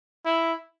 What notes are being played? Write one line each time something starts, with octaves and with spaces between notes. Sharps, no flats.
E4